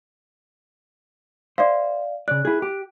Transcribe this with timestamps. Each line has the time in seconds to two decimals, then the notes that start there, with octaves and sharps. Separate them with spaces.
1.58 C5 D5 E5 F5
2.28 C#3 D5 F#6
2.45 E4 G#4
2.62 G4